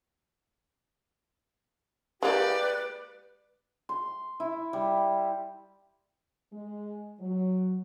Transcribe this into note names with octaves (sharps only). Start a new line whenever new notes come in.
G#3 A#3 E4 G4 B4 D5
C6
E4
G3
G#3
F#3